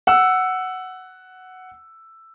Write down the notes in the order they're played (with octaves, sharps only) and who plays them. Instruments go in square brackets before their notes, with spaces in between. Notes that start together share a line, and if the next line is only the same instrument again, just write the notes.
[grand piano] F#5 E6